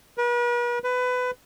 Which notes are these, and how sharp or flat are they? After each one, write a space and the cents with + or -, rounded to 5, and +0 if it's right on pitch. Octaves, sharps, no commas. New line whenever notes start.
B4 -45
B4 +20